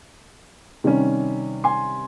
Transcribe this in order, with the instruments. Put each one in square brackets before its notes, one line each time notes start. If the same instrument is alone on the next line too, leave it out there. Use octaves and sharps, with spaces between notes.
[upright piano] C3 D#3 G3 C#4
G#5 C6